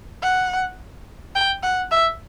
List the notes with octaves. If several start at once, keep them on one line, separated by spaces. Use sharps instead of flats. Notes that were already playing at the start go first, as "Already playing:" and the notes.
F#5
G5
F#5
E5